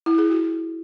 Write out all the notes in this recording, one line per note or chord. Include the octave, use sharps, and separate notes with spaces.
E4
G#4
F#4